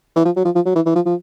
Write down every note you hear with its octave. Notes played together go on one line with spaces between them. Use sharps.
E3
F3
F#3
F3
F3
F#3
E3
E3
F3
F3